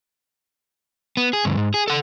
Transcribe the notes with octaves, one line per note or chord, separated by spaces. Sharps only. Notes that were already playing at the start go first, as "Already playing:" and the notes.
B3
G#4
D2 G2
G#2
G#4
A4 F#5